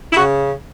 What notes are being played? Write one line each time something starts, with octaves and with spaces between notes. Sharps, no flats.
E4
C#3 F#4